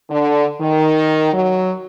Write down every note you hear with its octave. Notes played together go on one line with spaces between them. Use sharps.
D3
D#3
F#3